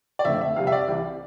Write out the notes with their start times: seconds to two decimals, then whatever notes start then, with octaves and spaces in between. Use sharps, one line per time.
0.19 D5
0.25 F2 D3 A3 E5
0.41 E5
0.56 F2 C3 G3 F5
0.67 E5
0.72 D5
0.88 C2 C3 E3